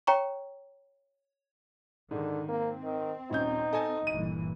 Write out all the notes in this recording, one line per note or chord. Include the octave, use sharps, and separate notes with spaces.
C#5 G5 A#5 C#6
G#2 D3 D#3
A#3 C4
D#3
D#1 C#4 D#4 G6
A4 D#5 G#5
G1 A#2 E3 D#7